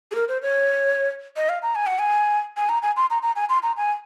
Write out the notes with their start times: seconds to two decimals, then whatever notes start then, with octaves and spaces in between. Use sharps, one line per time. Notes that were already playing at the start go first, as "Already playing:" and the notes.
0.11 G#4
0.15 A#4
0.28 C5
0.42 C#5
1.37 D#5
1.49 F5
1.62 A#5
1.75 G#5
1.87 F#5
1.99 G#5
2.57 G#5
2.69 A#5
2.82 G#5
2.97 C6
3.10 A#5
3.23 A#5
3.36 G#5
3.49 C6
3.63 A#5
3.77 G#5